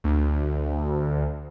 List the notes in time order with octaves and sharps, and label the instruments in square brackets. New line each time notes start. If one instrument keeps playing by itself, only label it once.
[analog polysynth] D2